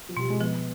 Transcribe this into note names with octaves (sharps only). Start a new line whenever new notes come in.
F3
B2 G3
G#3
F3 B3